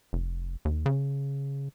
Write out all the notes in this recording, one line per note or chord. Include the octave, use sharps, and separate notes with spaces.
F1
D#2
C#3